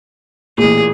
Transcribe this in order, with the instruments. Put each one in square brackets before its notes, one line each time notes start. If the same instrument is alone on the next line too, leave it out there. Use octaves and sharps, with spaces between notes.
[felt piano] A1 A#2 [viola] G#4